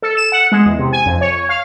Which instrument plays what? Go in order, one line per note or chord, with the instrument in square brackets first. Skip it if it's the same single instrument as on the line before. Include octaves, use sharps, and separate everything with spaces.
[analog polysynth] A4
E7
F#5
G#3
E2
C3
G#5
F2
C#5
F5